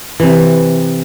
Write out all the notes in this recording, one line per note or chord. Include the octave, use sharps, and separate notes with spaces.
C3 E3